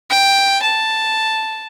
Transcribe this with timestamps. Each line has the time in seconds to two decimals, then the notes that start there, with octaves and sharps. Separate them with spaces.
0.10 G5
0.62 A5